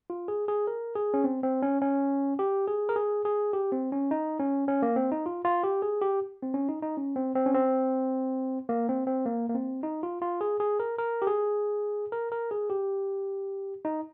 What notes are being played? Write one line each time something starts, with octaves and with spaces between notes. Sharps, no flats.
F4
G#4
G#4
A#4
G#4
C#4
C4
C4
C#4
C#4
G4
G#4
A#4
G#4
G#4
G4
C4
C#4
D#4
C#4
C#4
A#3
C4
D#4
F4
F4
G4
G#4
G4
C4
C#4
D#4
D#4
C#4
C4
C4
C#4
C4
A#3
C4
C4
A#3
A#3
C4
D#4
F4
F4
G#4
G#4
A#4
A#4
G4
G#4
A#4
A#4
G#4
G4
D#4